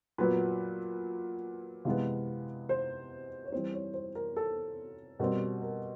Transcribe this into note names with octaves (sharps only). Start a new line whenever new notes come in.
A#2 F#3 B3 B4
C3 E3 G#3 B3 F5
C5
C#5
E3 G3 C4 C5
C#5
C5
A#4
A4
B2 G3 C4 A#4
A#4